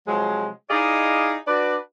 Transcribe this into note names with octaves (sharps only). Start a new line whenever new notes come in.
C3 F3 F#3 G#3
D#4 E4 G#4 D5 D#5 F5
D4 F#4 B4 D5